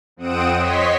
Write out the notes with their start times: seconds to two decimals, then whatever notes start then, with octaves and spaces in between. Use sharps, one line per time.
0.17 F2 C4 F#5 D#6 D7 E7
0.56 C#5 D#5 C6 C#6 B6